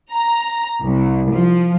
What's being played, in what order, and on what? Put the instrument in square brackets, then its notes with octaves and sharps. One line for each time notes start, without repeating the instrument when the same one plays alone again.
[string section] A#5
C2
F3